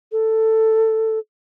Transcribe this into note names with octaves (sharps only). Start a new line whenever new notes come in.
A4